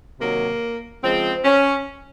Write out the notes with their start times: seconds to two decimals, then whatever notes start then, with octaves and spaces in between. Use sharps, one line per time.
0.18 C3 D#3 F#3 A#3
1.03 C#3 F3 G#3 C4
1.45 C#4